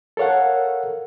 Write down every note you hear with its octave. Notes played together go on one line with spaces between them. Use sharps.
A4 A#4 C#5 F5 F#5